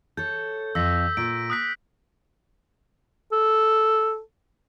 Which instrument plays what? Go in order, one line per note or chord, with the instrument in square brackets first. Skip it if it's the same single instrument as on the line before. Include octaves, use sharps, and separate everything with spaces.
[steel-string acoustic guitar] A4 C#5 [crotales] G6
[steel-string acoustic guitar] F2 [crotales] E6 A#6 B6
[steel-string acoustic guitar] A#2 [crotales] D7
[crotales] D#6 F#6 B6
[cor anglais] A4